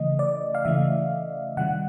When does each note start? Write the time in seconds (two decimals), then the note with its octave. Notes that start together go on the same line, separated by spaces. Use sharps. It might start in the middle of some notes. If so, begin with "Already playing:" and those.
Already playing: C#3 E3 A3 D#5
0.19 D5
0.55 F5
0.65 C#3 E3 A3 E5
1.57 C3 D#3 G3 F#5